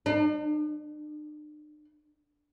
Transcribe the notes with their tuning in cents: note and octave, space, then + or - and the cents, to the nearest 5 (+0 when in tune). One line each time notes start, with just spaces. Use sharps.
D4 +45